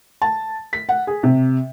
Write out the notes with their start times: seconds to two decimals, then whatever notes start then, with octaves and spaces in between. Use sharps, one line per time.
0.22 A5
0.73 B6
0.89 F#5
1.07 G#4
1.23 C3